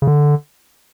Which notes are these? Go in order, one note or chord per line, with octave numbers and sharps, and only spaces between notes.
C#3
D3